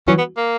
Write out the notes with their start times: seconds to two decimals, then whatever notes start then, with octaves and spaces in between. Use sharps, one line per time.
0.08 E3 F#3 C#4
0.18 B3
0.37 A#3